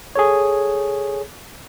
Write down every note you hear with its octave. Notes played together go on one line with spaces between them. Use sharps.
G#4 A4 C#5